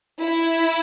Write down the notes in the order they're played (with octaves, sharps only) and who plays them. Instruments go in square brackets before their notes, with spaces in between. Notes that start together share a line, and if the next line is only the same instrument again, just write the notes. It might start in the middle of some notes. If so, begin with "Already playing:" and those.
[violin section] E4